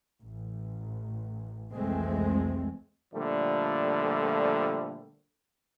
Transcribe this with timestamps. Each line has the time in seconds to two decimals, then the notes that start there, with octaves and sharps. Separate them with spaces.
0.19 A1
1.72 C2 F2 E3 G#3 A3 C4
3.14 A#2 D3 F3 G3 A3